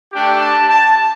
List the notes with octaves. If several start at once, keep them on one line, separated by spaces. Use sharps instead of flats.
A3 D4 G4 G5
A5
A5